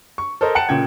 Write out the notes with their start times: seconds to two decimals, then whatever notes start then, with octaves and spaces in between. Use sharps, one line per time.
0.18 C#6
0.41 A4 A#4 C5 D#5
0.55 F#5 G5 A5 C#7
0.69 A#2 C#3 G5 G#6